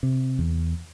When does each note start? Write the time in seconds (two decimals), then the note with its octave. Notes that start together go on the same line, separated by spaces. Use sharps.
0.03 C3
0.39 E2